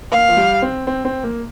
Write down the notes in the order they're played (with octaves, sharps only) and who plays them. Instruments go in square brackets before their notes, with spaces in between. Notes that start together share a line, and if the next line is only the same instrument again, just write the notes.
[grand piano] A#3 [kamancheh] F5
[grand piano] F3
G3
C4
C4
C4
A#3